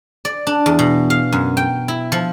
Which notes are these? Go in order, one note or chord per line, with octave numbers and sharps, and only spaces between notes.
D5
D4
E2
B2
F5
F#2
G5
E4
F3